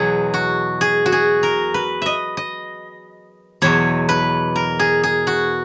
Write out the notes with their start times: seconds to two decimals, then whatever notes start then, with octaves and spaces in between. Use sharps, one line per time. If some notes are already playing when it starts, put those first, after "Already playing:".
Already playing: E2 B2 F#3 G#4
0.34 F#4
0.81 G#4
1.06 F#4
1.12 G#4
1.43 A#4
1.74 B4
2.02 D#5 E5
2.37 D#5
3.62 E2 B2 F#3 C#5
4.09 B4
4.56 A#4
4.79 G#4
5.04 G#4
5.27 F#4